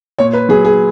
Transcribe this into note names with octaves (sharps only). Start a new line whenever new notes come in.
A#2 C#5
B4
F#3 G#4
G#4